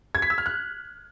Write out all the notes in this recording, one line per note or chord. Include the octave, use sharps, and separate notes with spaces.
G#6
B6
E6
F6
F#6